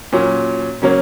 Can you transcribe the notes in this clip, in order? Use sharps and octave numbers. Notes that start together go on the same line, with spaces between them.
A#2 F#3 C#4
C#3 F#3 A#3 C#4